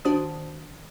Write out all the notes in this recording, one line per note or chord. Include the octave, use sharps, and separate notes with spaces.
D#3 D4 F#4 C5 A5 D#6